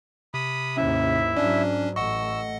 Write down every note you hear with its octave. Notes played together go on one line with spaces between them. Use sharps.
C3 B5 D#6
D#2 G#2 C#4 E4 E5
G#2 F#3 C#4 D4 D5
A1 A3 D#5 F#5 C#6 E6